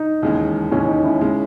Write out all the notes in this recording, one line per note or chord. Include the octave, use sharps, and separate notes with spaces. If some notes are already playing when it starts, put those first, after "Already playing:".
Already playing: D#4
E1 D#2 C#3 E3 G#3
E1 D#2 C#3 E3 G#3 C#4
D#4
C#4 E4
C#3 G#3